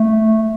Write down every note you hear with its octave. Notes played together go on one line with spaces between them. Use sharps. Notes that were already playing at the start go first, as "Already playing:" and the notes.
Already playing: A3